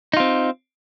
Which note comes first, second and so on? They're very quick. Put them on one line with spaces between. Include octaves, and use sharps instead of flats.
D#4 F4 C4